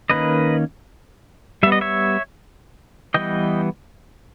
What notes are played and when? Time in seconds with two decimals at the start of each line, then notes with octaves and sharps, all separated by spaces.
0.10 D#3 A#3 C#4 B4 D#5
1.63 G3 B3 E5
1.72 D#5
1.81 C#5 E5
3.14 E3 G3 B3 D#5 G5